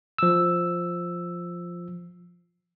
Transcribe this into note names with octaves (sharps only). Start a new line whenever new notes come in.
F3 E6